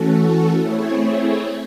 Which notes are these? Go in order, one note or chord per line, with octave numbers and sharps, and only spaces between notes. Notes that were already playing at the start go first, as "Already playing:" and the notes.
Already playing: E3 A3 C#4 F#4 A4
A3 C4 E4 G#4 C#5